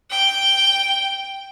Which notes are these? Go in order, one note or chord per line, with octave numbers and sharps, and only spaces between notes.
G5